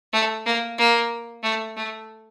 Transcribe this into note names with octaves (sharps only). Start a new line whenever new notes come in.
A3
A#3
A#3
A3
A3